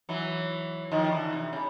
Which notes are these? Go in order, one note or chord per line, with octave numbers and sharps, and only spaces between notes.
E3 F#3
D#3 F3
D3 E3
C3
C#3